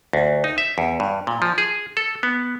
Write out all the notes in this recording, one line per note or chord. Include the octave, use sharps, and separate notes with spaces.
D2
D#4
E5
E2
G2
A#2
F3
G#4
A4
B3